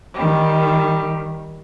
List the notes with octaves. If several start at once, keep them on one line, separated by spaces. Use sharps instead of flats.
D#3 G3